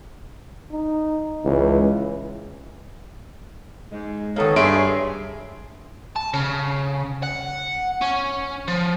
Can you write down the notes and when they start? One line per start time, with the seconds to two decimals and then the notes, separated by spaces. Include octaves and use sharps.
0.72 D#4
1.45 C#2 E3
3.91 G#2 G#3
4.36 D#2 D#3 A#3 B3 A4 C#5
4.56 G2 G#4 E5 C6 D7
6.16 A5
6.33 C#3
7.23 F#5
8.01 C#4
8.68 F3